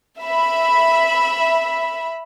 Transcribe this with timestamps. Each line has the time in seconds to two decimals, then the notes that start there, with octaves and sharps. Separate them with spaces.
0.20 E5 B5